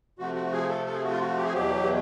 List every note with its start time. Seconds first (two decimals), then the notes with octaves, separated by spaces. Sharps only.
0.19 C3 F3 A3 F#4
0.35 F#4
0.52 G#4
0.69 A4
0.86 A4
0.94 G#4
1.03 F#4
1.11 F4
1.20 F#4
1.36 G4
1.45 G#4
1.52 E2 B2 F#3 G4